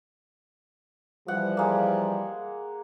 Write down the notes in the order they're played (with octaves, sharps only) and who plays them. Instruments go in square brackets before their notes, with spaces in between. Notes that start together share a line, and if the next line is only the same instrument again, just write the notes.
[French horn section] E3 F3 G3 [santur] F#5
[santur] G#3 A#3